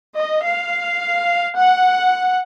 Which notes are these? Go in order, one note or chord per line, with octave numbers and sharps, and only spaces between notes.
D#5
F5
F#5